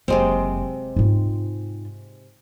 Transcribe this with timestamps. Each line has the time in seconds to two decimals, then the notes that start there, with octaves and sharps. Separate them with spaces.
0.08 F#1 C3 G#3 C4
0.96 G#2 F4